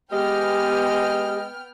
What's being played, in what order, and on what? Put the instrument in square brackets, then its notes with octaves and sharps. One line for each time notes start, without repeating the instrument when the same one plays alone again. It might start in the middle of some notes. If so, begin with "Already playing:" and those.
[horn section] G#3 D#5 [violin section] B3 G5 F6 [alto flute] G4